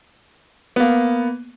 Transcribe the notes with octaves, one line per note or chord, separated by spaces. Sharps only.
A#3 B3